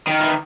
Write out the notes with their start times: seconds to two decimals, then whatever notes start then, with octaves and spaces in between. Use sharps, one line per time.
0.07 D#3
0.20 E3